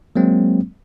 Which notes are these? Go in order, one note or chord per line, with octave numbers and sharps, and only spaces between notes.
F#3 G#3 A#3 C4